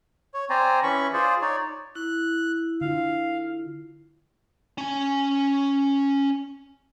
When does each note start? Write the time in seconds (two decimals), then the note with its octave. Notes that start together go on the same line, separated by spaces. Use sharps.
0.34 C#5
0.50 C4 C5 D5 G#5 A#5
0.83 E3 C#4 B5 C#6
1.13 F4 G#4 C5 D5
1.42 D#4 C#5 D5
1.95 E4 F#6
2.81 D3 F4 F5
4.78 C#4 G#5